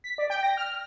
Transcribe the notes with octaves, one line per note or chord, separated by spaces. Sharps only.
B6
D5
G5
A#6
F6